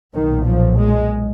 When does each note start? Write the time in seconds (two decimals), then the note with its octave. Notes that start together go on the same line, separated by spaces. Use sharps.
0.13 B1 A#2 D#3
0.45 F3
0.78 G#3